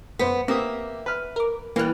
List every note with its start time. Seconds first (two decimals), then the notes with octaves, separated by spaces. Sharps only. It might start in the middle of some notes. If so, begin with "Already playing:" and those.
0.19 F#2 B3 C5 B6
0.48 A#3 C4 G4 E5 D#6
1.06 B4 F6
1.36 A#4 D6
1.76 E3 G3 A#3 F6 F#6